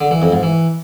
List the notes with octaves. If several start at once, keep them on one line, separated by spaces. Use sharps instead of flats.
D3
E3
F2
G#2
E3